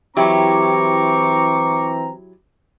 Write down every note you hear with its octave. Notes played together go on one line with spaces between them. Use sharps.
E3 F#3 C4 E4 G4 A#5 C#6 D6